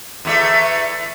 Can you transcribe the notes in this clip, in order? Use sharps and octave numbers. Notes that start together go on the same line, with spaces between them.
E2 A3 E5